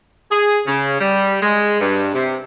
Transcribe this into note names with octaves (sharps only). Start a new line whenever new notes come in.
G#4
C#3
G3
G#3
G2
C3